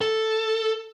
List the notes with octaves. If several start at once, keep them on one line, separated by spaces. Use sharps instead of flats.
A4